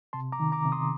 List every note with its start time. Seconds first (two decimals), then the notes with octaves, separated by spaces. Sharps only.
0.13 C3 A5 C6
0.32 A#5 D6
0.40 D#3
0.52 A#5 D6
0.65 C3
0.72 C6 D#6